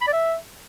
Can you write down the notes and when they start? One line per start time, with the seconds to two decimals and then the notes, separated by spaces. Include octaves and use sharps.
0.01 B5
0.07 D5
0.13 E5